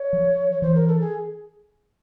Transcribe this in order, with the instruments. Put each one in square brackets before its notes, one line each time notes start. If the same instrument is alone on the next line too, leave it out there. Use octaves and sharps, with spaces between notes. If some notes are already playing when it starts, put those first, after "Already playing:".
Already playing: [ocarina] C#5
[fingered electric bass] F3
[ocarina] C#5
[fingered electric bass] E3 [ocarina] C5
[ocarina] A#4
A4
G#4